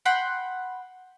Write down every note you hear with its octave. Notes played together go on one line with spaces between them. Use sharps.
F#5 G5 B5 C6